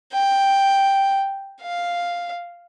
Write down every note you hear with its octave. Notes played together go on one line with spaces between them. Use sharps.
G5
F5